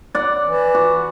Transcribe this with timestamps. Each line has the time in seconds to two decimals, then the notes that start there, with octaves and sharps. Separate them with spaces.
0.15 D5 F#5
0.45 E3
0.75 F#4